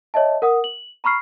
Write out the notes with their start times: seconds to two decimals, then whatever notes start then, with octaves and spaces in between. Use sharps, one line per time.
0.14 C#5 D#5 E5 A5
0.42 A#4 F#5 D#6
0.64 F#7
1.04 A#5 B5 C#6 F6 C7